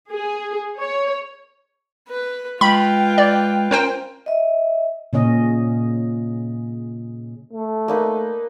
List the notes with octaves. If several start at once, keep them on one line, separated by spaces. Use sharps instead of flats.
G#4
C#5
B4
G#3 F4 B4 G5 B5
D5
C#4 A#4 C5 G5
D#5 E5
A#2 C#3 C#4 D#5
A3
A#3 D#4 B4